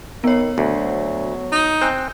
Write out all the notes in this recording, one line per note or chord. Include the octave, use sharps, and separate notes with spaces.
D#3 B3 C#5
D2 F#3
D#4
C4 G#5 F#6